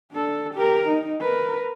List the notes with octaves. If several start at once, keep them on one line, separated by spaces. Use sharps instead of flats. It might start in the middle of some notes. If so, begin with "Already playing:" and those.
D4 A4
G4 A#4
D#4
A#4 B4